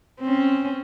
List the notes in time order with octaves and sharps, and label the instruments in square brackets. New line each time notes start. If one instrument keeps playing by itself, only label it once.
[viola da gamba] C4 C#4